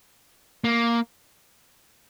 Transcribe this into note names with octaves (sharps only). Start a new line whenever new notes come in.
A#3